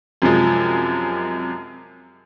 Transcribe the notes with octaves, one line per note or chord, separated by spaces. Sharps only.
F#2 C3 F3 G#3